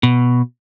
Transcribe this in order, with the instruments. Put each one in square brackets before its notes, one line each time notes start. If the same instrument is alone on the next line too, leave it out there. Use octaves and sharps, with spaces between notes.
[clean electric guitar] B2